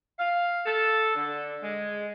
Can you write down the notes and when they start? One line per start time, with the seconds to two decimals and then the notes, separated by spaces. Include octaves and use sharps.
0.18 F5
0.66 A4
1.16 D3
1.62 G#3